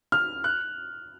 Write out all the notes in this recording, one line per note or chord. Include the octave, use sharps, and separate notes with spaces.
F6
F#6